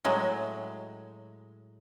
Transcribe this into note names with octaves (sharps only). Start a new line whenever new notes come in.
A2 F#3 G#3